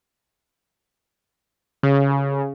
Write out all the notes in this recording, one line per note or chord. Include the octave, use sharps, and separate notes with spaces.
C#3